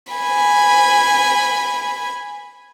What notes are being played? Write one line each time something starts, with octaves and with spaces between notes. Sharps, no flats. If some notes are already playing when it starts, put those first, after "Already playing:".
G#5 B5